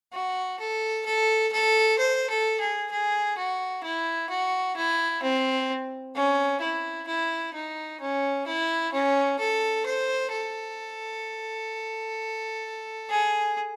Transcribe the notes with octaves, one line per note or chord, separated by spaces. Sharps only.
F#4
A4
A4
A4
C5
A4
G#4
G#4
F#4
E4
F#4
E4
C4
C#4
E4
E4
D#4
C#4
E4
C#4
A4
C5
A4
G#4